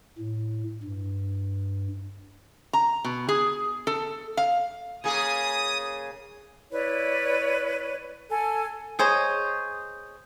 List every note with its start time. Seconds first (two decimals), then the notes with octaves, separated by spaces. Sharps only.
0.18 A2
0.83 G2
2.73 A#5
3.05 B2
3.29 G#4
3.87 A4
4.37 F5
5.04 C#3 A#3 G#4 D#6
6.71 E4 B4 C#5 D5
8.30 A4 G#5
8.99 G#4 C5 C#5 D#5